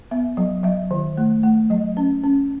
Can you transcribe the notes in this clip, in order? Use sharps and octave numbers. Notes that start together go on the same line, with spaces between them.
B3 E5
F#3
F#3 E5
D#3
A3
A3
F#3 D#5
C#4
C#4